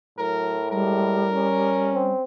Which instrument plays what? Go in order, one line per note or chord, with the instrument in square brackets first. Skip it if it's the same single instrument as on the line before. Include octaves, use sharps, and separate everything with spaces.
[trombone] A2 [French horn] F#3 [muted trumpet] A#4
[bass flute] G3 [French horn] G#3 [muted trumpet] A#4
[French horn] C#4
[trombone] C4